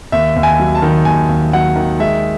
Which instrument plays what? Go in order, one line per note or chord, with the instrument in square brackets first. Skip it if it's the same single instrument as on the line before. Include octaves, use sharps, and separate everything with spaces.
[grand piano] D#2 E5
D#2
G#5
F#3
A5
D#3
D#2 G#5
D#2
F#3 F#5
D#3
G#3 E5